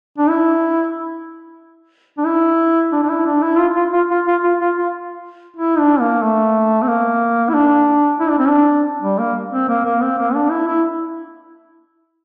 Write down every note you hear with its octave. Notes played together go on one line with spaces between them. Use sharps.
D4
E4
D4
E4
D4
D4
E4
D4
E4
F4
F4
F4
F4
F4
F4
F4
F4
E4
D4
A#3
A3
C4
A#3
E4
D4
E4
D4
C4
D4
G3
A#3
C4
A#3
A#3
C4
A#3
D4
E4
E4